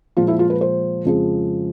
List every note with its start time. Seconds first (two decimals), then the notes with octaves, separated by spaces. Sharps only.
0.17 A#2 F3 G#3 F4
0.28 E4
0.39 F4
0.50 B4
0.61 C5
1.05 F2 C#3 F3 G#3